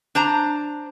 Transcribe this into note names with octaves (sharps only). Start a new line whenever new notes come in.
D4 C5 A#5